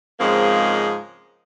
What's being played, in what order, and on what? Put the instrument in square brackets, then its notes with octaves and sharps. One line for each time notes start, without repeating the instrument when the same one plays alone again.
[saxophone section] G#2 C#3 F3 G#3 A#3 C4